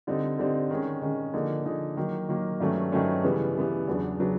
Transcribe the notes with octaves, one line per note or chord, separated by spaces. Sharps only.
D3 G3 C4 D#4
D3 G3 C4 D#4
D#3 G#3 C#4
D#3 G#3 C#4
D3 F3 A#3 D#4 G#4
D3 F3 A#3 D#4 G#4
D#3 F#3 A#3
D#3 F#3 A#3
G2 D#3 F#3 A3 C#4
G2 D#3 F#3 A3 C#4
C#3 E3 G3 B3
C#3 E3 G3 B3
E2 C#3 F#3 B3 D4
C#3 F#3 B3 D4